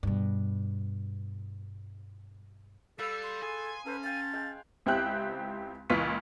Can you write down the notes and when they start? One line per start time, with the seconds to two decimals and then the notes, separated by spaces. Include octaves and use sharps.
0.03 G2 B2
2.99 G3 A4 B4 F5 E6
3.23 C6
3.42 G#4 A4 G#5
3.86 C#4 A4 B4 C5
4.04 F5 G5 A6
4.33 G#3 F5 G5
4.86 C#2 C4 E4 G4 F#6
5.90 C#2 A#2 E3 F4 C#6 B6